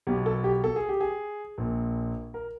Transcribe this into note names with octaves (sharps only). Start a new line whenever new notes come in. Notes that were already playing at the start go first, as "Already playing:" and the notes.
B1 B2 G4
A4
G4
A4
G#4
G4
G#4
A#1 A#2
A#4